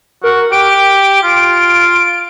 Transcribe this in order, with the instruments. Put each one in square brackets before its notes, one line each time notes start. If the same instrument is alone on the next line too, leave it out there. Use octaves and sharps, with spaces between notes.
[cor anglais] F#4 [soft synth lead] A#4
[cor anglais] G4 [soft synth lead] D7
[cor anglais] F4